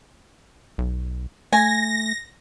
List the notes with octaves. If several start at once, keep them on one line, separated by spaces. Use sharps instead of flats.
B1
A3 G#5 A#6